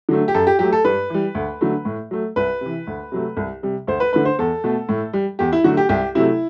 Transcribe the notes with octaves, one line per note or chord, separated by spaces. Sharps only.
D3 F#3 A3
G4
F#2 A4
G4
F#3 A3 G4
A4
G2 B4
E3 G3
D2
D3 F#3 A3
A2
F#3 A3
C2 B4
C3 E3
D2
C3 F#3 A3
C2
C3 G3
D2 C5
B4
D3 A3 B4
C5
E2 A4
B2 A3
A2
G3
E2 G4
E4
D3 F#3 A3 F#4
G4
C2 G4
C3 F#3 A3 E4